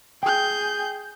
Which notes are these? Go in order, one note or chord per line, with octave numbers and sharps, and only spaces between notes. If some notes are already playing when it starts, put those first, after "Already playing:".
G#4 G5 G6